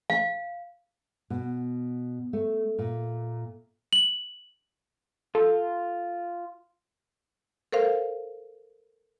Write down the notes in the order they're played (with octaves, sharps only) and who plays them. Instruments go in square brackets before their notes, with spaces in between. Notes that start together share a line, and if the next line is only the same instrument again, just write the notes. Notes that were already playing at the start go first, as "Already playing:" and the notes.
[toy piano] F5
[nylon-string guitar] B2
A3
A#2
[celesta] F#7
[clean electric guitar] F4 [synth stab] A4
[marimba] A4 A#4 C5 F5